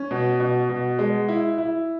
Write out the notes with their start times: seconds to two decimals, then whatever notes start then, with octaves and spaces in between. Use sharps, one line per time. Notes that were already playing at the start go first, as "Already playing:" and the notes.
Already playing: C#4
0.11 B2
0.40 B2
0.69 B2
0.99 G#3
1.29 E4
1.58 E4